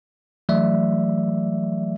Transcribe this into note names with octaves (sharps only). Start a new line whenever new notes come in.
E3 F#3 A3 D5 E5